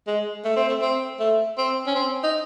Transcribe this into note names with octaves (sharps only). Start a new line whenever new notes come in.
G#3
A3
C4
A3
C4
A3
C4
C#4
C4
D#4